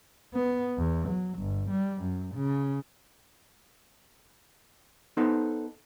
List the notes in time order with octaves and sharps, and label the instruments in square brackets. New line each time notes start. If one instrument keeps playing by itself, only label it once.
[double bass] B3
E2
F#3
G1
G3
F#2
C#3
[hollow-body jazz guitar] B3 D#4 A4 C5